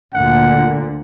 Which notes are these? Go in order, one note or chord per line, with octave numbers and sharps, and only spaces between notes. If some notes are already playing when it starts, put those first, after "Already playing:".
D2 A#2 D3 F#5